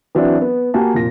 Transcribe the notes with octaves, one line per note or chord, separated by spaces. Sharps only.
E3 F#3 C4 D4 E4 F#4
B3
A#3 F#4 G4 G#5 A5
F1 A#2 A#6